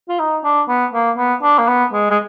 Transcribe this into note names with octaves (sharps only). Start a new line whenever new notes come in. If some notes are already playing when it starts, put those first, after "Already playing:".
F4
D#4
D4
B3
A#3
B3
D4
A#3
B3
G#3
G#3